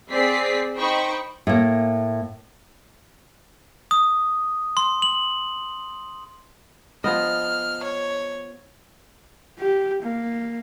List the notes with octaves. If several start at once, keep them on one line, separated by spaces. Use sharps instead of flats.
C4 G#4 D5 B6 C7
D#4 C5 G5 B5 C#6
A2 A#3
D#6
C6
F#7
F3 B3 D#5 F6
C#5
G4
A#3